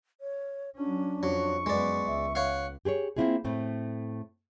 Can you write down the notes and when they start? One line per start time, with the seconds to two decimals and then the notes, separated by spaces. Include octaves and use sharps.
0.21 C#5
0.76 F#3 C#4 D4
1.23 F2 F#3 C#6
1.66 F#2 G#3 B3 D5
2.07 C#2 E5
2.35 C#5 F5 F#5
2.85 G4 G#4 B4 C#5
3.17 A#3 C4 C#4 E4 F4 G#4
3.45 A2 A3 C4